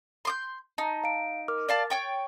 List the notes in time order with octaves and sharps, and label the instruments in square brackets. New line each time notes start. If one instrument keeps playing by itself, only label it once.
[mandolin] C6 D6 G6
[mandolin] D#4 [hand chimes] A5 A#5
[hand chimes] F5 D7
A#4 D6 F6
[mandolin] D5 F5 A5 [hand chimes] A6
[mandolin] C#5 G5 C#6